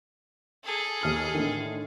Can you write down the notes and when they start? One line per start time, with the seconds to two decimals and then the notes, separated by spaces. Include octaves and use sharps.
0.64 G#4 A4
1.01 D#2 F6 F#7
1.34 A2 D3 D#3